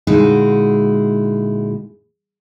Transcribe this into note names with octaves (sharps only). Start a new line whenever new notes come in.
A#2 D3 G#3 D#4 E4 F#4